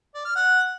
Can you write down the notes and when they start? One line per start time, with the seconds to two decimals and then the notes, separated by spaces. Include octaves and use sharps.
0.15 D5
0.25 F6
0.36 F#5